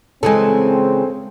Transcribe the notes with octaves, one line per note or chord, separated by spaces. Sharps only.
C#3 E3 G#3 C4 A4 G#5